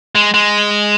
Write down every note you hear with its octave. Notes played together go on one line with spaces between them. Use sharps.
G#3
G#3